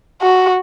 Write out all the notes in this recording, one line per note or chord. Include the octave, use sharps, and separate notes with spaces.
F#4